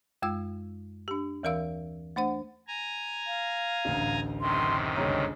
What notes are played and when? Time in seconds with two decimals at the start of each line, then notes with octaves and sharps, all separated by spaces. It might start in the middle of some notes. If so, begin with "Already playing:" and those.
0.22 F#2 G#3 F4 E6
1.08 D4 G4
1.43 D#2 E3 A#4 E5 F5 E6
2.16 A3 D4 C5 F#5
2.68 G#5 A#5
3.27 F5
3.85 A1 D2
4.41 F#2 C3 D#3 C6
4.96 G1 C#2 C#5 A#5